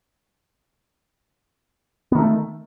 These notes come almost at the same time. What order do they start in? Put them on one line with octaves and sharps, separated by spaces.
B3 D#3 A3